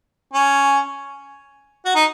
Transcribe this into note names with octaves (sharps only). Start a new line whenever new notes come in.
C#4
F#4
D#4